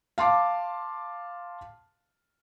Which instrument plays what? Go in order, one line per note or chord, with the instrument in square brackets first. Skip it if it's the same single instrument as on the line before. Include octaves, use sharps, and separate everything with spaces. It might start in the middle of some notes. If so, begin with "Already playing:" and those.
[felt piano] F5 A5 C6 D6